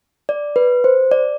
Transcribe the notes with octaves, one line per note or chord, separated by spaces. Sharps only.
D5
B4
C5
D5